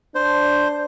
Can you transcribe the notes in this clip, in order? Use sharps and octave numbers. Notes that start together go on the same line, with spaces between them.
D4 C5